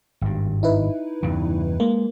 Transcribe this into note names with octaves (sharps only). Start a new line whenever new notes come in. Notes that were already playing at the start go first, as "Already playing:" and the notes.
G#1 G2
D#4 E4 B4
E2 G2 C#3
G#3 A#3